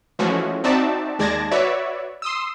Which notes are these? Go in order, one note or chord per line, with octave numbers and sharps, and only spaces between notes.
E3 F3 G#3 A3 C#4 F#4
C4 D#4 F#4 D5 E5 A5
D#2 G#3 D5 A5 G#6 A#6
F#4 B4 C#5 D5 E5
C6 D#6 E6